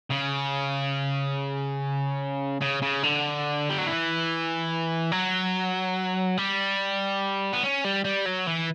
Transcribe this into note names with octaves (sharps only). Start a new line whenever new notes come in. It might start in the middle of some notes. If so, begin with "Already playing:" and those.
C#3
C#3
C#3
D3
G3
F#3
E3
F#3
G3
B3
C#4
G3
G3
F#3
E3